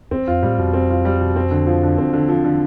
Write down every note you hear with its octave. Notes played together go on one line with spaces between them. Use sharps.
E2 C4
F2 F4
A2 G3
F2 B2
C4
F4
G3
B2
C4
D3
F3
D3
E2 C4
D3
F3
D3